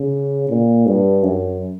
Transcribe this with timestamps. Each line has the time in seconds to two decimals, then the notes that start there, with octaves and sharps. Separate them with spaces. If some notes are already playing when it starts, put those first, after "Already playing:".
Already playing: C#3
0.49 A#2
0.87 G2
1.23 F#2